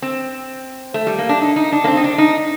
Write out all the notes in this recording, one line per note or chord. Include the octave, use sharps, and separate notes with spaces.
C4
A3
G3
A#3
D4
D#4
D#4
D4
A#3
C4
D#4
D4
D#4